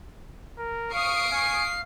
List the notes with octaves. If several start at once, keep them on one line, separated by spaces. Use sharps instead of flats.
A#4
F5 C#6 D#6 C7 D7
F5 G#5